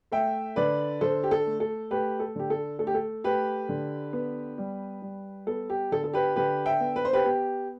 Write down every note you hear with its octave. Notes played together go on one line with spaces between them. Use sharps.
A3 E5 G5
D3 B4 D5
D3 A4 C5
G4
A4
A3
A4
A3 G4 B4
A4
D3 G4
A4
A3 A4
G4
A4
A3 G4 B4
D3
B3
G3
G3
B3 A4
G4
D3 A4
A4
G4 B4
D3 G4 B4
E5 G5
B3
B4
C5
G4 B4
B3 G4